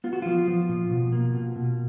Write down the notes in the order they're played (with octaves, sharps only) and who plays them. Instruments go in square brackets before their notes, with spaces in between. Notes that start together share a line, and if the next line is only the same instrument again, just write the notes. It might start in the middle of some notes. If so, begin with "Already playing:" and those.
[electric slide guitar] B3 F4
F#4
F3 F4
F3
A#2
B2
A#3
B2
B2